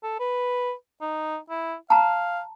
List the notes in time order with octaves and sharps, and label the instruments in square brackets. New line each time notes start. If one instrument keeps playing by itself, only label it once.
[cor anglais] A4
B4
D#4
E4
[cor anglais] F5 [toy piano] A5 A#5